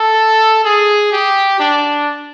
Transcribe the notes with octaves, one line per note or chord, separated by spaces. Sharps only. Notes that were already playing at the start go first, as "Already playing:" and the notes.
Already playing: A4
G#4
G4
D4